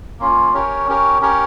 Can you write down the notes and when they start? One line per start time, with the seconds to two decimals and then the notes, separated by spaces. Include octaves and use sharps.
0.20 A#3 C#4 F4
0.54 C#4 G4 A#4 C#5
0.88 C#4 G4 A#4 C#5
1.21 C#4 G4 A#4 C#5